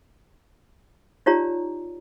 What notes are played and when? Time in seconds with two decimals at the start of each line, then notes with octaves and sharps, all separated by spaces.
1.26 D#4 F4 G4 C#5 D5 A#5